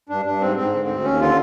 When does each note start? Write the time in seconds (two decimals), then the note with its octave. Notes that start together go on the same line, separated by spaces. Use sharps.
0.09 G2 D4
0.25 G2 D4
0.41 G#2 C4
0.56 G#2 C4
0.73 D3
0.88 D2
1.04 D#2 C#4
1.20 D3 F4